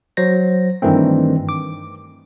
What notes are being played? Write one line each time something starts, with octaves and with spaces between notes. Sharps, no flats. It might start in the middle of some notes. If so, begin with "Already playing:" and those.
F#3 C5 A#6
G2 D#3 E3 A3 C4
D6